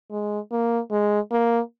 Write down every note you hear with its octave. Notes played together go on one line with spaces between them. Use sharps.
G#3
A#3
G#3
A#3